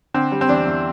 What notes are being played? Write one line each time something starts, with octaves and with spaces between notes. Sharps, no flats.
D3 C4
G3
C4
E2 D4
E2